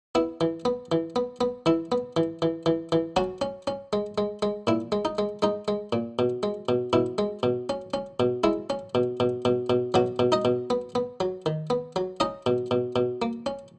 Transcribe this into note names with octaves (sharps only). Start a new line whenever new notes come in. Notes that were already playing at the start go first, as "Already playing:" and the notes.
B3 E4
E3
B3
E3
B3
B3
E3 E4
B3
E3
E3
E3
E3
F#3 C#4 F#4
C#4
C#4
G#3
G#3
G#3
A#2 E4
G#3
D#4
G#3
G#3 D#4
G#3
A#2
B2
G#3
B2
B2 E4
G#3
B2
C#4
C#4
B2
G#3 E4
C#4
B2
B2
B2
B2
B2 F#3 F#4
B2
D#4 D#5
B2
B3
B3
F#3
D#3
B3
F#3
C#4 D#4 D#5
B2
B2
B2
A#3
C#4